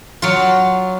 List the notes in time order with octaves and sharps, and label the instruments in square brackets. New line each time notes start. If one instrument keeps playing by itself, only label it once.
[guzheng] F#3 F4